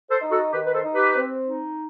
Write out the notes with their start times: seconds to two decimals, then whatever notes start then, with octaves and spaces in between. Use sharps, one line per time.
0.10 A4 C5
0.20 D#4
0.31 F#4 A4
0.53 D#3 G4 B4
0.66 B4
0.73 A4 C5
0.84 D#4
0.94 G4 B4
1.16 C4
1.47 D#4